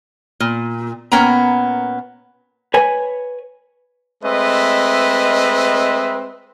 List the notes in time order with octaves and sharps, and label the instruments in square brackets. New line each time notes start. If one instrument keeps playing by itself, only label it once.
[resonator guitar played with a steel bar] A#2
A#2 A#3 B3 C#4 G5 A#5
[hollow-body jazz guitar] B4 C#5 G#5
[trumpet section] G#3 A3 C4 B4 D#5 E5